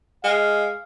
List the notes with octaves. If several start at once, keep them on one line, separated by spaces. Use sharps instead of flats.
G#3 F5